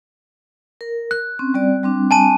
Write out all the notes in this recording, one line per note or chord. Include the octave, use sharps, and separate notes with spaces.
A#4
F#6
C4 C#4
G3 C4 D5
G3 C4 D4
G#5 A5 D#7